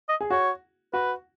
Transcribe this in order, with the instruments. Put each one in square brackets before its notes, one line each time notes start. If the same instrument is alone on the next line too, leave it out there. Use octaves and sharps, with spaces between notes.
[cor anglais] D#5
[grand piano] G#4
[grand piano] F#4 [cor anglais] C#5
[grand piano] F#4 [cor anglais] B4